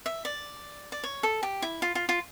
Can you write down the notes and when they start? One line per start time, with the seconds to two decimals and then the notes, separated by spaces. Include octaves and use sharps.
0.06 E5
0.25 D5
0.92 D5
1.04 C#5
1.23 A4
1.43 G4
1.62 E4
1.82 F4
1.95 F4
2.09 F4